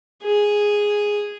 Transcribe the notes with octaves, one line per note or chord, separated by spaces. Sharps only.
G#4